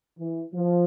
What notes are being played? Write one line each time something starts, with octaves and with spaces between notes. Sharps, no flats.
E3
F3